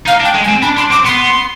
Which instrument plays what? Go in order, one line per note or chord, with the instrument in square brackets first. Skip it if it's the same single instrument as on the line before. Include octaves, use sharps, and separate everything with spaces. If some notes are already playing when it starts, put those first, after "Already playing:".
[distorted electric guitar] D#4 [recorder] F5
[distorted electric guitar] D4
[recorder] G5
[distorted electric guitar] G#3
[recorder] G#5
[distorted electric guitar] C4
[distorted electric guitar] D4 [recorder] B5
[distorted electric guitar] D4 [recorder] C6
[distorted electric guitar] C4 [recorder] D6
[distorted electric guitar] B3 [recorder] C6